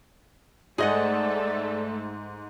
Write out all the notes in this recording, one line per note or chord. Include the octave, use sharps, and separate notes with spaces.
G#2 A3 G#4 A4 D5 D#5 F#5